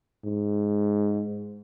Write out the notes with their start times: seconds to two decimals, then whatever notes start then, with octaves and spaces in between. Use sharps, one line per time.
0.24 G#2